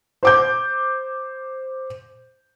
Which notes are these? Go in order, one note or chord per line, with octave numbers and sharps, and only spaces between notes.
C5 D6 G6